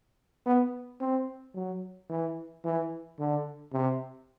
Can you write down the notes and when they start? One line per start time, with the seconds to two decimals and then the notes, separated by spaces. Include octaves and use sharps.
0.46 B3
1.01 C4
1.55 F#3
2.10 E3
2.64 E3
3.19 D3
3.73 C3